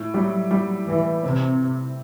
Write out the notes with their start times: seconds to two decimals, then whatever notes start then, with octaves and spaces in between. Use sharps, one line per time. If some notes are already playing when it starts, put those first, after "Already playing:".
Already playing: A2
0.14 F#3 G3
0.51 F#3 G3
0.87 A2 E3
1.23 C3 C4